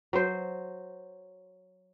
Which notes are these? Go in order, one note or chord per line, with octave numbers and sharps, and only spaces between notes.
F#3 C5